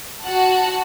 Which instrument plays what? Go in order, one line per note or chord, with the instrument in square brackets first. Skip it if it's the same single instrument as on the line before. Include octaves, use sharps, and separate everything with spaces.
[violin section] F#4 F#5 A5